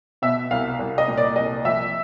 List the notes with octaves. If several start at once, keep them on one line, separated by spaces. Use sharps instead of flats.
B2 E5
C2 F5
C2
D#5
A#2
D5
C2 D#5
F3 E5